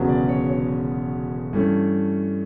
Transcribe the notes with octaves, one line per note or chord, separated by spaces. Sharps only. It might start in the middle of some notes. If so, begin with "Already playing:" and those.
Already playing: E1 D2 C#3 F#3 B3
D5
C#5
C#5
G2 E3 A3 C#4